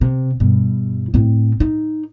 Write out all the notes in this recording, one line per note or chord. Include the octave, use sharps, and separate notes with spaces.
C3
G2 B2
A2 C4
D#4